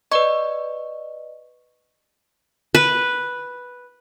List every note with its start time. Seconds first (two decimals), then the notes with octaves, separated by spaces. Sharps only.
0.12 B4 D5 D#5 C#6
2.75 B4